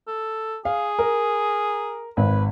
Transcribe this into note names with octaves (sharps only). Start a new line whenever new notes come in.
A4
G#4 F5
A#4
G#1 B4